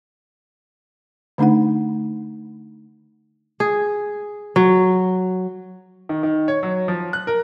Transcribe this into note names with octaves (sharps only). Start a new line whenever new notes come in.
D3 A3 D4 D#4 F#5
G#4
F#3
D#3
D#3
C#5
F#3
F3
F#6
A#4